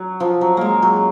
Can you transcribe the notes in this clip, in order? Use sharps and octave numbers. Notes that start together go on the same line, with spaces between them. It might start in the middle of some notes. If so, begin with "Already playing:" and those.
Already playing: F#3
F3
F#3
G#3 A#3
F#3